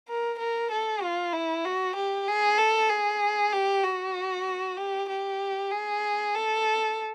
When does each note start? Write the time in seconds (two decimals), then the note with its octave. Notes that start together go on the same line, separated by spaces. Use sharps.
0.08 A#4
0.39 A#4
0.71 A4
1.03 F4
1.33 E4
1.65 F#4
1.96 G4
2.28 G#4
2.58 A4
2.90 G#4
3.53 G4
3.83 F#4
4.77 G4
5.09 G4
5.71 G#4
6.35 A4